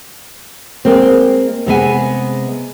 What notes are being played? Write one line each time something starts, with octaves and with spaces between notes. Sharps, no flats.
G#3 A#3 C4
C3 G#3 B3 G#5